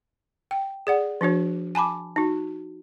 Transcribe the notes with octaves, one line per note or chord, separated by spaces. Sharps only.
G5
G#4 D5 F#5
F3 D4 F#4 C#5
G#5 A5 B5 D6
D#4 F#4